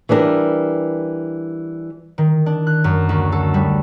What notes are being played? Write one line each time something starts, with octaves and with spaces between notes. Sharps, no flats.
E3 G3 D4 A#4
D#3
D4
F#6
F#2
D2
A4
G3